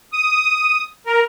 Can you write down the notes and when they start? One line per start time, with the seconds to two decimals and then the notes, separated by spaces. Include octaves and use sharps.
0.13 D#6
1.07 A#4